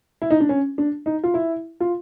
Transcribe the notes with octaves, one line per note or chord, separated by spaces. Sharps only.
E4
D#4
D4
C#4
D4
D#4
F4
E4
F4